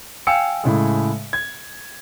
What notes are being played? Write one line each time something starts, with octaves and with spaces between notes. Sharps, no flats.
F5 G5 G#5 E6 C#7
A2 C#3 G#3
G#6